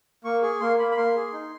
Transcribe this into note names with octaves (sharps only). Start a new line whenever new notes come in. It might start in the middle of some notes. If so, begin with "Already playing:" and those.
A#3 C#6
G#4 C#6
A#3 C6
A#3 B5
B5
A#3 C6
G#4
D#4